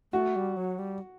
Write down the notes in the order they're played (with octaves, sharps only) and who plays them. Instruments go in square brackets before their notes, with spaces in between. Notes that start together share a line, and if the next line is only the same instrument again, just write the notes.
[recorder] A3 [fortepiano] F#4
[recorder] G3
F#3
G3